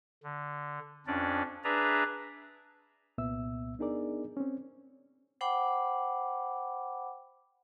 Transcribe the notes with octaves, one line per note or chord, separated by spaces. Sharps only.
D3
F2 C#4 D4 D5
D4 G#4 B4 D5 E5 A#5
C2 A#2 B3 E5 E6
B3 D4 D#4 G#4 A#4 D5
C4 C#4
C5 F#5 G5 B5 D6